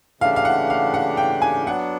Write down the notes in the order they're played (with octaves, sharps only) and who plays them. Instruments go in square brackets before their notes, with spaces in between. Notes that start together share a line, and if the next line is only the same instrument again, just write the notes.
[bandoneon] C#3 E3 A3 D4 G4 [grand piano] F5
[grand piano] F5
F#5
F5
F#5
G5
G#5
[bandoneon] F#3 B3 D4 [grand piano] F#5